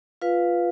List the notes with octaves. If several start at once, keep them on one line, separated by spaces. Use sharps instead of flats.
F4 B4 F5